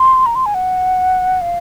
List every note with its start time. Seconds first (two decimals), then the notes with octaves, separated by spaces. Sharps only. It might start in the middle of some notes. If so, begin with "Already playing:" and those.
Already playing: C6
0.26 A#5
0.35 C6
0.46 G#5
0.54 F#5
1.41 F5